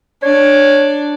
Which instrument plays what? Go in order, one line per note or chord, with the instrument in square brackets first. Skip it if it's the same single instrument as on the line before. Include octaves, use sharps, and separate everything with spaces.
[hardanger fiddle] D4 [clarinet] C#5